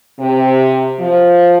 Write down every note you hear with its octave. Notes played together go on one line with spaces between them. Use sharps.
C3
F3